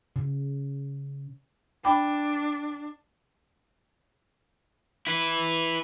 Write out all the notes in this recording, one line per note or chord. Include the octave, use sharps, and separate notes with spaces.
C#3
D4 G5 B5 D6
E4 B4